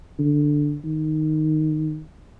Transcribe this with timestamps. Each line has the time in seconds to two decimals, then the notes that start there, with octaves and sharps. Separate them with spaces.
0.19 D3
0.84 D#3